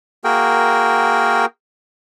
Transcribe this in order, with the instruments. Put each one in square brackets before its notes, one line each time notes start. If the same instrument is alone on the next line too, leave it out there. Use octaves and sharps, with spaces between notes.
[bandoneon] A#3 F#4 G#4 A#4 G5